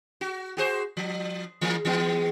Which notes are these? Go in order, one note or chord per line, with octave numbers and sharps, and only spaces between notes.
F#4
F#4 G#4 C5
F3
E3 G#3 A#3
E3 G#3 B3